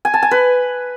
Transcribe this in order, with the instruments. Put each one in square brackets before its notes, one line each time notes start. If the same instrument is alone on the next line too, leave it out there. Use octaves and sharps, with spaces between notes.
[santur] G#5
A5
G#5
B4